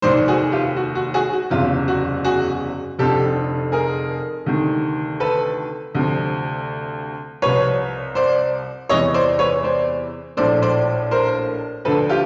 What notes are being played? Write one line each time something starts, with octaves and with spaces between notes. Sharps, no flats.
F1 D#2 D#3 C5 D5
F#4 G#4
F4 G4
F#4
F#4
F#4 G#4
F#4
F#1 E2 C3 F4
F#4
F#4 G#4
F1 F2 D3 F3 G4 A4
G#4 A#4
D2 C3 D#3
A4 B4
D2 C3 F3
C2 C3 F3 B4 C#5
C5 D5
E2 C3 E3 C#5 D#5
C5 D5
B4 C#5
C5 D5
A#1 A2 F3 C5 D5
C5 D5
A#4 C5
D2 D3 F3 A4 B4
F4 G4